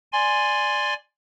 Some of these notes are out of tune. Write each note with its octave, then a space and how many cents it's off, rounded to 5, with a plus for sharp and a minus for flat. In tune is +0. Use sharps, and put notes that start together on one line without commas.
D5 +5 G#5 +0 C6 +0